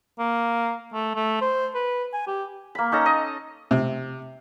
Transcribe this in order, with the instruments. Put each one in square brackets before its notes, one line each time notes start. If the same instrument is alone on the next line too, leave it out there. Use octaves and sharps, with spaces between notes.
[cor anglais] A#3
A3
A3
C5
B4
G#5
G4
[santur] A#3 B5
C#4 D#4 A4 A#5
D#5
[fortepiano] C3